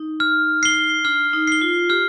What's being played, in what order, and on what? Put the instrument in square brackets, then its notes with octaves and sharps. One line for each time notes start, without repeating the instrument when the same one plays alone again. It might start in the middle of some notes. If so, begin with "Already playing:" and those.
Already playing: [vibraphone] D#4
[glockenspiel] F6
C7 G7
[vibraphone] D4 [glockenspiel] F6
[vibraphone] D#4
[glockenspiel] C7 G7
[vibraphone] F4
[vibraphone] G4 [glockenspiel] F6